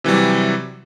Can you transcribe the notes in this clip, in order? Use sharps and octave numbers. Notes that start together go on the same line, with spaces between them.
C3 E3 F#3 G3